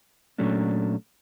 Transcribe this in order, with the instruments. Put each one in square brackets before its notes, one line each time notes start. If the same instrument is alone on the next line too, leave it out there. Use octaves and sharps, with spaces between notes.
[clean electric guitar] A#2 F#3 A3 C#4 D4